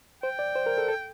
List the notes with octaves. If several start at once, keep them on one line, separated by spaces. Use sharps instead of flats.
C5 G5
D5
C5
A#4
A4
A4